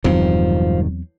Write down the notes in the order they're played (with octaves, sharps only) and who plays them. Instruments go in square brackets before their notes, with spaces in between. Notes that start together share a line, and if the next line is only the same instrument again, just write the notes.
[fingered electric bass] E1 G2 D#3 [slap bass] E2 F#3 C4 [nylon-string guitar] F3